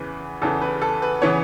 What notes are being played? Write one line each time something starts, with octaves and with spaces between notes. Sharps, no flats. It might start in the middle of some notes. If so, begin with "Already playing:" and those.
Already playing: E2 C#3 E3 B4
E2 C#3 E3 A4
B4
A4
B4
C#3 E3 B3 C#5